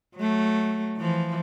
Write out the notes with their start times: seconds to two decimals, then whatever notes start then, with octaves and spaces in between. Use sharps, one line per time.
0.16 F#3 A3
0.98 E3 F3